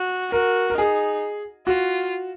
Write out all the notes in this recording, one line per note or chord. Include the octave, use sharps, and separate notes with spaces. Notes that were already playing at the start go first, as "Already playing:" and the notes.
Already playing: F#4
F#4 A#4
A#4
D#4 G#4
F4 F#4